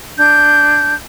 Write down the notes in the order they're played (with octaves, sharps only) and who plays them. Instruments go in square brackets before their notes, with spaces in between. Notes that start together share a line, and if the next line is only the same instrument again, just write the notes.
[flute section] D4 G6